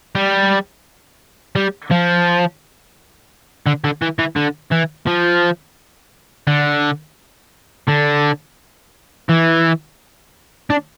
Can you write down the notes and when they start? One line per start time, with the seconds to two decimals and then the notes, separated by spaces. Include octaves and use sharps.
0.15 G3
1.56 G3
1.91 F3
3.67 D3
3.85 D3
4.02 E3
4.19 E3
4.36 D3
4.72 E3
5.07 F3
6.47 D3
7.89 D3
9.29 E3
10.70 D4